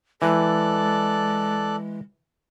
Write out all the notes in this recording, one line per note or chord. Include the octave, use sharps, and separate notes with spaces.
E3 G#3 A4 D5 F#6